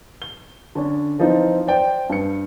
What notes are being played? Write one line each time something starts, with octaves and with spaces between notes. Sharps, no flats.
G7
D3 C#4 D4
E3 F3 C4 D#4 F4
C5 D5 G5
G2 C#7